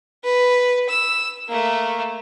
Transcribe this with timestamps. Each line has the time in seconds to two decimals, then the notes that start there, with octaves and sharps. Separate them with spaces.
0.24 B4
0.89 E6
1.49 A3 A#3